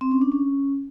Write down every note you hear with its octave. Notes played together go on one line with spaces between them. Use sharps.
C4
C#4
D4
C#4